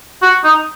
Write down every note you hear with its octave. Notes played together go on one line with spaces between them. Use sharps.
F#4
D#4